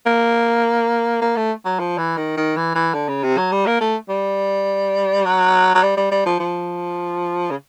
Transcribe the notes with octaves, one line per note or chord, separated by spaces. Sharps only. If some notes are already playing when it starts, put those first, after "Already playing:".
A#3
A#3
A3
F#3
F3
E3
D#3
D#3
E3
E3
D3
C#3
C3
F#3
G3
A#3
A3
G3
F#3
F#3
G3
G3
G3
F3
F3
C#3